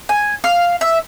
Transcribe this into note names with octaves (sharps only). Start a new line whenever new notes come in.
G#5
F5
E5